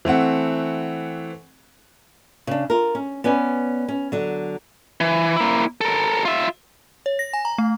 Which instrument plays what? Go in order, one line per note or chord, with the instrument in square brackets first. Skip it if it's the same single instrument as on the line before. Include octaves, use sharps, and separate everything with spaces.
[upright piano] E3 A3 C4 F#5
[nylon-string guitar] C#3 D4
F4 A#4
C#4
B3 C#4 D5 G#5
C#4
D3 F#3
[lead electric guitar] E3
A#3 E4
A4 A#4
F4 E5
[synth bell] C#5
A#6
G#5
A#5
A3